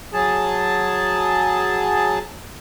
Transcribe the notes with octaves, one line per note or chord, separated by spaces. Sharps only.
F#3 G#4 A5